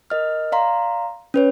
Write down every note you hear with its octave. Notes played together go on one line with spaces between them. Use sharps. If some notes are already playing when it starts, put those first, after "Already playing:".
A#4 D#5 F6
D5 F5 A#5 C6
C#4 B4 C#5